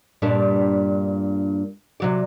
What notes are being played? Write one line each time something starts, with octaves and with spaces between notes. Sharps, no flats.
G2 A#2 D4
C3 F#3 D5